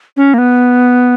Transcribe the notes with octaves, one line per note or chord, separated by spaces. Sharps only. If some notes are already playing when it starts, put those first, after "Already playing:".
C#4
A#3
B3